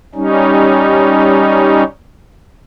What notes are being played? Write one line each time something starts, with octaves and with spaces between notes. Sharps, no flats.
G3 C#4 D#4